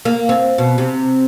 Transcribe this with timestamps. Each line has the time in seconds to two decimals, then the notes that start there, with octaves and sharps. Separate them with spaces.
0.05 A#3
0.29 C4
0.58 B2
0.78 C3